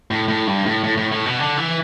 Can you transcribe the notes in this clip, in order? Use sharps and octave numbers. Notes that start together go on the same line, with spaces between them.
A2
A2
G2
A2
A2
A2
A2
B2
D3
E3